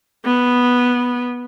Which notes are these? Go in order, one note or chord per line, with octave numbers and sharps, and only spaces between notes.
B3